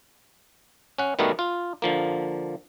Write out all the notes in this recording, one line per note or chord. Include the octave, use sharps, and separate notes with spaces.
C#4 F#5
D#3 G3 A3 B3 F#4 A#4
F4
D3 F3 A#3